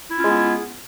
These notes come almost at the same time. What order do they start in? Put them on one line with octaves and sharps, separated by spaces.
E4 F4 C#4 G#3 B3